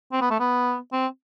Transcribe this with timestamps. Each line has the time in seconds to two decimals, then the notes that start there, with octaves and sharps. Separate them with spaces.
0.12 C4
0.21 B3
0.30 A3
0.40 B3
0.93 C4